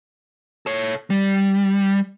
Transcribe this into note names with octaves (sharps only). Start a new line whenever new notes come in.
A4 C#5
G3